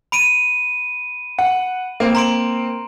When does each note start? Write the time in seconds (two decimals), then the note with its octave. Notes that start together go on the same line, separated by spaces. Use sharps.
0.12 B5 D7 D#7
1.39 F#5
2.00 A#3 C4
2.15 A#5 C6 D7